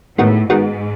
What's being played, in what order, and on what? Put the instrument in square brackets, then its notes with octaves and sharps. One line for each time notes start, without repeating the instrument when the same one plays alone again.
[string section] A2 [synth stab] D#3 G#3 B3 F#4
[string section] G#2 [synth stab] D#3 G#3 B3 F#4